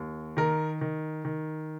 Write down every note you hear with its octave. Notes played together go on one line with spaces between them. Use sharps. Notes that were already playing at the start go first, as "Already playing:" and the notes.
Already playing: D#2
D#3 A#4
D#3
D#3